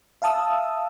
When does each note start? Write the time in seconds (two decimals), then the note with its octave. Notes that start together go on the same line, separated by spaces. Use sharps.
0.22 E5 F5 A5 D#6 E6